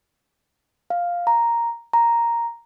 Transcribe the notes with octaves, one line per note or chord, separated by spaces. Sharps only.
F5
A#5
A#5